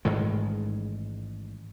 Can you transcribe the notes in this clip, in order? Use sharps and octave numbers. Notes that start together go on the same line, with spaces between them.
A1 G#2 D#3 G#3